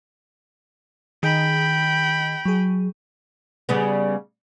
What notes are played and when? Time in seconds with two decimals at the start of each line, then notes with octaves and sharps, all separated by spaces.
1.23 D#3 G#4 D#5 G5 B5
2.45 F#3 G#4
3.69 C#3 G3 B3